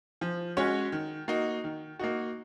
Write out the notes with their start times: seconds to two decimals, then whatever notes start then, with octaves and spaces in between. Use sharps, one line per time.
0.21 F3
0.57 G#3 C#4 F#4 C#5
0.92 D#3
1.28 A#3 D#4 F#4
1.64 D#3
1.99 A#3 D#4 F#4